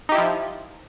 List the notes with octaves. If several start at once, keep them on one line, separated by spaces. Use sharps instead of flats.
F3 D#4 E4 G4